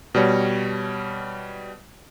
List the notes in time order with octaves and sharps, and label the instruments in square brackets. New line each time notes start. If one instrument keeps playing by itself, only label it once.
[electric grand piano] B2 G3 C#5